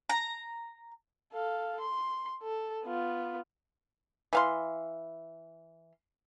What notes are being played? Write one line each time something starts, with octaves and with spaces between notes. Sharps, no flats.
A#5
A4 F5
C6
A4
B3 F4
E3 F5 C6